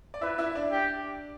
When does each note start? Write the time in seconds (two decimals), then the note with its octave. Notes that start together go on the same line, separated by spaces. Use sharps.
0.14 D5
0.21 E4 B4 E5
0.38 E4 E5
0.55 D4 D5
0.71 G4